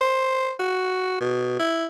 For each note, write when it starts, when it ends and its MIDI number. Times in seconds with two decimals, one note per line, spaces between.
0.01 0.53 72
0.59 1.16 66
1.21 1.57 47
1.59 1.86 64